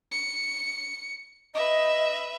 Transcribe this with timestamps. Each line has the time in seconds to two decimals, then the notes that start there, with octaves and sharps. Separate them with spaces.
0.11 C#7
1.55 B4 D#5 E5